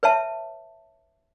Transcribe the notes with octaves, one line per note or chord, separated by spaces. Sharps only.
B4 C#5 E5 A5